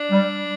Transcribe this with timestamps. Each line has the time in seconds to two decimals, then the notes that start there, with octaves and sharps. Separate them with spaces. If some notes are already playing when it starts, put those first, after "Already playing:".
Already playing: D4
0.11 G3